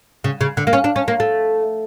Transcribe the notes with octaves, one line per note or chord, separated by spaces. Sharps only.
C#3
C#3
D3
A#3
C#4
D4
C#4
A#3
A3